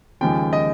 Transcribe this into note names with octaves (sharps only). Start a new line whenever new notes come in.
D#2 C#3 F3 G#3 G5
D#5